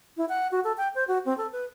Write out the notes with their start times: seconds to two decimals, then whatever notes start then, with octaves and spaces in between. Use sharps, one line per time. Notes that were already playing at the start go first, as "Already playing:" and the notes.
0.17 E4
0.29 F#5
0.52 F#4
0.64 A4
0.77 G5
0.95 C5
1.08 F#4
1.25 C4
1.38 A4
1.52 B4